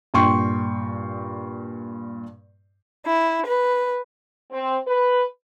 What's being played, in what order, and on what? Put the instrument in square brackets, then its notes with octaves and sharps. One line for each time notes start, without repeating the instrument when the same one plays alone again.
[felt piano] G2 A#2 G5 C6 C#6
[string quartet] E4
B4
[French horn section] C4
B4